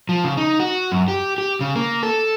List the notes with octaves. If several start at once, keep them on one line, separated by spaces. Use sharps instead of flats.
F3
C#3
D#4
F#4
F#2
G4
G4
C#3
A#3
A4